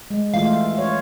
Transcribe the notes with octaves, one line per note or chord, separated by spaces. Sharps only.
G#3
E3 A3 F4 F5
F4 C#5